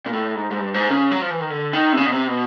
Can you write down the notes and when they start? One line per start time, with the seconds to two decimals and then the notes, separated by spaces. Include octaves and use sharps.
0.06 A#2
0.13 A2
0.35 G#2
0.51 G#2
0.59 G2
0.74 G#2
0.90 C#3
1.11 F#3
1.22 F3
1.30 E3
1.40 D#3
1.50 D3
1.73 D#3
1.92 C3
1.97 C#3
2.06 B2
2.12 C3
2.28 B2